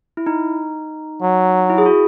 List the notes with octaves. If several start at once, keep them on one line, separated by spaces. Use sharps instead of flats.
E4
D#4
F#3
E4
G#4
F#4